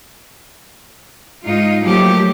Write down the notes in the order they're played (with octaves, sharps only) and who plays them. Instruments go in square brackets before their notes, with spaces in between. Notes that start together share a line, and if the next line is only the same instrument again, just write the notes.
[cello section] G#2 D#4 F4
F3 F#3 A3 A#3 G4